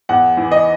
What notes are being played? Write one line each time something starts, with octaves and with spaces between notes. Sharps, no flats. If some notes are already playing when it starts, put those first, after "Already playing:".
E2 F#5
E3
D#5